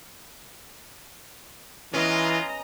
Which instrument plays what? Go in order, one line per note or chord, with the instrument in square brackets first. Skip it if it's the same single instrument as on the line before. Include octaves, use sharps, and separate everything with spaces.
[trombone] E3 [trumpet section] G#3 F4 [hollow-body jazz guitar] B3 C#4 [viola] D#5 A#5